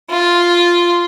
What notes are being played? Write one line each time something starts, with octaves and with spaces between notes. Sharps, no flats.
F4